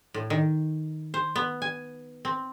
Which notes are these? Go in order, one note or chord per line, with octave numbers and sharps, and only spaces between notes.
A2
D#3
C5
B3
G#5
C4